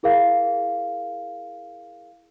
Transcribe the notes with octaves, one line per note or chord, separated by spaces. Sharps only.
E4 G#4 A#4 F5